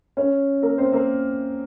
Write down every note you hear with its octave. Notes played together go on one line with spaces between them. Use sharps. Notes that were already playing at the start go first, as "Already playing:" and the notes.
C#4 C#5
A#3 A#4
C4 C5
A#3 A#4